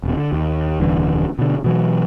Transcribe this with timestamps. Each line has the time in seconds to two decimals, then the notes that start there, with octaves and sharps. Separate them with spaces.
0.03 D#1 B2
0.17 D3
0.32 D#2
0.80 D#1 C2 D3 E3
1.39 B2 D3
1.64 B2 E3 F#3